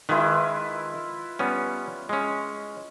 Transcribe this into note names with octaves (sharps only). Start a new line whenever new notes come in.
D#3 G#3 E4 F4 B4
G3 B3 C#4
G#3 C#4